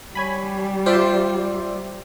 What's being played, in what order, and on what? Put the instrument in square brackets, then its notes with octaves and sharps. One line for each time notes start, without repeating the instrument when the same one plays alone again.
[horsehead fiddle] G3 [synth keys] C#5 G#5 B5
[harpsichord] F4 [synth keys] C5 D5 E5